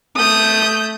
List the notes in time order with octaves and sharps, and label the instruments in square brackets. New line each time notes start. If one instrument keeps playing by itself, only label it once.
[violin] A3 G6 [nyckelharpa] D#6